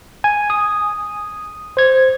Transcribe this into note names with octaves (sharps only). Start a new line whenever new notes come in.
G#5
D#6
C5 G#6